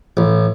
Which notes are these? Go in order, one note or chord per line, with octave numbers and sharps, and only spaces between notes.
A1